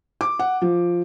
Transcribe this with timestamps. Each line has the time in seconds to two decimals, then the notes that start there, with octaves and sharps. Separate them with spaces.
0.21 D6
0.39 F#5
0.62 F3